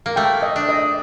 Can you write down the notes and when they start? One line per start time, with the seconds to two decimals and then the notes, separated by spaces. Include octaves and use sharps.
0.06 A#3
0.16 A3 G5
0.43 D#5
0.56 D4
0.69 D#5